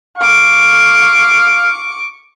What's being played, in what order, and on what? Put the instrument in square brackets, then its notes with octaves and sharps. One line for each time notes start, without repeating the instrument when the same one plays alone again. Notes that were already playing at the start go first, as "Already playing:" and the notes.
[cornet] F5 [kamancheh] C#6 D6